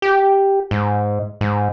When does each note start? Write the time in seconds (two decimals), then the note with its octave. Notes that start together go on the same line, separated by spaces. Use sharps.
0.02 G4
0.71 G#2
1.41 G#2